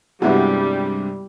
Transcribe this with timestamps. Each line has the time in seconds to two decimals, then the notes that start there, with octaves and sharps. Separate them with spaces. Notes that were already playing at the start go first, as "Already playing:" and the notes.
0.22 G2 C3 G3 G#3 B3 E4 F#4